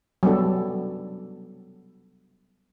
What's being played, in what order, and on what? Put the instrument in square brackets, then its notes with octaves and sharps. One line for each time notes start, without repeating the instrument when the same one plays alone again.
[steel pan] F#3 G3 B3 D4 A4